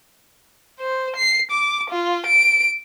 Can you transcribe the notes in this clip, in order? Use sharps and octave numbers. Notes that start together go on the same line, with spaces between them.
C5
C7
D6
F4
D7